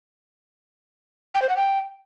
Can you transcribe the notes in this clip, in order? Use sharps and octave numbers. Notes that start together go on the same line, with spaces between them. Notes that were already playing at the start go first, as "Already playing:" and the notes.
G5
C5
F#5
G5